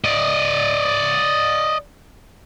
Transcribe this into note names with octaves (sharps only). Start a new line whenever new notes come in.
D5 D#5